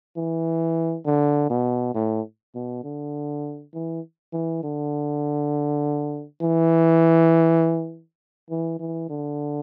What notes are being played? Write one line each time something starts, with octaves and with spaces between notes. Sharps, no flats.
E3
D3
B2
A2
B2
D3
E3
E3
D3
E3
E3
E3
D3